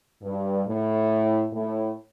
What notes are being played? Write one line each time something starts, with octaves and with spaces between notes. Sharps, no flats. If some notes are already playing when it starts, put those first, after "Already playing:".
G2
A2
A2